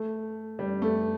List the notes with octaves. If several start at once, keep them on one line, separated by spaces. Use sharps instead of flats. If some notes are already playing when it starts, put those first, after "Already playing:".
Already playing: A3
G3
A3